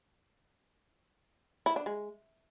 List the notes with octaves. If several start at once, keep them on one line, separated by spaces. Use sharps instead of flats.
E4
D4
G#3